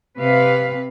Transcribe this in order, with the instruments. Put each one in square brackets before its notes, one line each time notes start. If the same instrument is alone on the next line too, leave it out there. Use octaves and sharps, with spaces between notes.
[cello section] C3 B4 F5